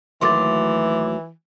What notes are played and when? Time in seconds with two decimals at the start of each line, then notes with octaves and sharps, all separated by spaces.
0.21 D#2 E3 F#3 A3 C6 D6 A6